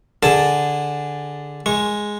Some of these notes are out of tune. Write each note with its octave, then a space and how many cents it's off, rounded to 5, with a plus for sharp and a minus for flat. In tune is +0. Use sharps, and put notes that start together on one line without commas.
D3 +0 G#4 -15 A5 +0
G#3 +0 C#6 -15